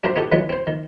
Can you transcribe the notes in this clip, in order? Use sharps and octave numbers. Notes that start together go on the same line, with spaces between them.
D4 F#4 A#4 C5 E5
B3 D#4 F#4 G4 A4
D#3 E3 F#3 G#3 B3
C4 C5
D#3